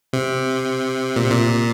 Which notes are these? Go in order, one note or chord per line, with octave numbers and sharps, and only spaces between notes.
C3
A#2
C3
A#2